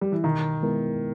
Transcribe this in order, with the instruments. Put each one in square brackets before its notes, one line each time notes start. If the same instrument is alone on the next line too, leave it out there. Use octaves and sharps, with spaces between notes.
[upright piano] G3
E3
[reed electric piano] B2 [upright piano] D#3
[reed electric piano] G#3 B3 E4 A#4